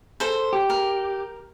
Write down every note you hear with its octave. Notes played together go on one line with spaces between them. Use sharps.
A4 C5
G4
A#4